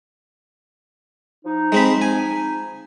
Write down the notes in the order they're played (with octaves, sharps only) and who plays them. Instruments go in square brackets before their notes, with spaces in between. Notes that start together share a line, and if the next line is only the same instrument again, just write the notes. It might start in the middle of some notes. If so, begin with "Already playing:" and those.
[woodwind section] F3 D#4
[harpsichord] G#3 C4 B5
G#5